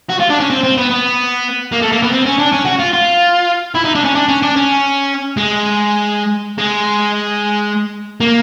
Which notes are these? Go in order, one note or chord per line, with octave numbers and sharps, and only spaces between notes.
F#4
F4
D4
C#4
C4
C4
B3
B3
A#3
A3
A#3
B3
C4
C#4
D4
C#4
F#4
F4
F4
E4
D#4
D4
C#4
D4
C#4
D4
C#4
G#3
G#3
A#3